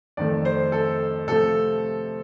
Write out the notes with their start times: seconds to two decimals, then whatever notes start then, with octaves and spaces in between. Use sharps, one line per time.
0.17 F2 D#3 A3 D5
0.45 C5
0.72 A4
1.28 C3 F3 A3 A4